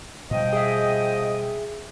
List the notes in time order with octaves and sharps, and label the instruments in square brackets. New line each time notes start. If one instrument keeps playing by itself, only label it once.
[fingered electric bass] B2 G3 [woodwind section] F3 D#5 G5
[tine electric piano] G#4 E5